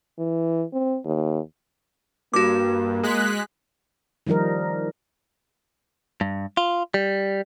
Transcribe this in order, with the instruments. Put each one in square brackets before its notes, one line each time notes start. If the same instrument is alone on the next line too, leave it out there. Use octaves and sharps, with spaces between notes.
[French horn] E3
C4
D#2
[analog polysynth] G2 [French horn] A#3 [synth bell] F#4 D6
[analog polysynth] G#3 F#6 B6
[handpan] D#3 F3 G3 D#4 A#4
[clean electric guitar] G2
F4
G3